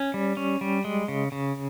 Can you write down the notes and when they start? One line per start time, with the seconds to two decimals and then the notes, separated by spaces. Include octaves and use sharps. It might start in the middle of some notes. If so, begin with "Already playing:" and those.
Already playing: C#4
0.14 G3
0.37 C#4
0.61 G3
0.85 G#3
1.08 C#3
1.32 C#3